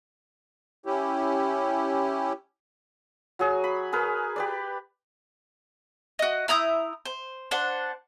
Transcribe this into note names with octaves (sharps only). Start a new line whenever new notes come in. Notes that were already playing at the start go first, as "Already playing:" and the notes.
C#4 E4 G4
F#3 F#4 G#4
B5
G#4 A#4 B4
G4 B4 D5
F#4 D#5
E4 A#5 D#6 G6
C5
D4 C5 F#5